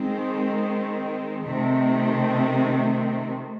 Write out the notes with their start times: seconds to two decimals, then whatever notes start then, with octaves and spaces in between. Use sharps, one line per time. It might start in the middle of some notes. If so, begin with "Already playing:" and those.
Already playing: D#3 G#3 C4
1.45 C3 D#3 A3 C4